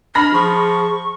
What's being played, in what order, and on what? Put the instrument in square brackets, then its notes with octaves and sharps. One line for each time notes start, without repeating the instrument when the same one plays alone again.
[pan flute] D4 [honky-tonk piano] B5 F6 A#6
[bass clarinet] F3 [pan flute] G#4 [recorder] C#6